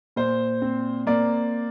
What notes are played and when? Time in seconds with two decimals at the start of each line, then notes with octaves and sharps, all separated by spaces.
0.16 A#2 C5
0.62 C4
1.07 A#3 D5